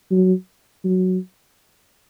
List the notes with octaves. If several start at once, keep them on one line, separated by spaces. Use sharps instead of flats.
F#3
F#3